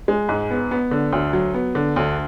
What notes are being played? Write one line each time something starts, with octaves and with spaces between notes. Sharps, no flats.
G#3
G#2
B3
B3
D3
D2
F#3
B3
D3
D2